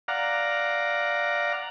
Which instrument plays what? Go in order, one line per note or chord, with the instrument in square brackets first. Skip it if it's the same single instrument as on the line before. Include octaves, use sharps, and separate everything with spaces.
[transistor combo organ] D5 F5 F#5 A#5